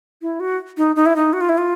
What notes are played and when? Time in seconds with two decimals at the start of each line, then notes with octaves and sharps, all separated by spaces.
0.22 E4
0.40 F#4
0.77 D#4
0.96 D#4
1.06 E4
1.16 D#4
1.33 F#4
1.41 F4
1.49 E4
1.58 F4